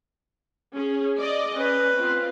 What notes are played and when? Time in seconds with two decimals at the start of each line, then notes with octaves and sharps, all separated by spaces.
0.74 C#4 G#4
1.19 D5 D#5
1.57 C#4 B4
1.99 C4 F4